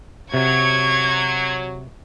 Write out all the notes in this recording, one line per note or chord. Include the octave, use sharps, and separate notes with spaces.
C3 F#3 C#6 G#6